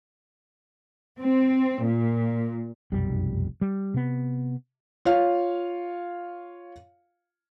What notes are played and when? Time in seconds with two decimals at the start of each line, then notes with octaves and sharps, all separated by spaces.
1.18 C4
1.83 A#2
2.92 F1 B1 F#2 G3
3.61 G3
3.94 C3 B3
5.05 F4 C#5 F5